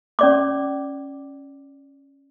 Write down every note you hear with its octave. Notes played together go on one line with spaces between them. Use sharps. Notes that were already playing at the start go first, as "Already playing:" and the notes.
C#4 D5 D6